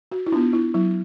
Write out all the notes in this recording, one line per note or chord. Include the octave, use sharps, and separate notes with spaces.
F#4
E4
B3 D4 F4
E4
F#3 E4